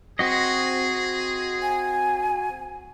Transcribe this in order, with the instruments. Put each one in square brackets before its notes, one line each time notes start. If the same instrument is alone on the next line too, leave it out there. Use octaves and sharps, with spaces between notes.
[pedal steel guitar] C4 F#4 D#5 [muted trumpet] G#4
[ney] G#5